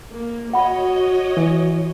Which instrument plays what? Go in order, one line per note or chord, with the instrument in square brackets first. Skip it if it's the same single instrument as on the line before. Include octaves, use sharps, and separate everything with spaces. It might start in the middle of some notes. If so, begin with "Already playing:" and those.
[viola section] A#3
[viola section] F#4 C#5 D#5 [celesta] F#5 B5
[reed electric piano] E3